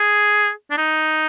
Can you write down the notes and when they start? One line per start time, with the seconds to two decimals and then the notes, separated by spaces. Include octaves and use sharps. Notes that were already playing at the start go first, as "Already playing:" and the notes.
Already playing: G#4
0.70 D4
0.78 D#4